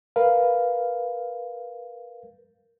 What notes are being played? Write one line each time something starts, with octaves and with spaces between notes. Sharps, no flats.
A#4 B4 F5